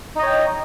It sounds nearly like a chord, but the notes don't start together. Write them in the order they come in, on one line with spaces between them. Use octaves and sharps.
D#4 D#5 C#5 G5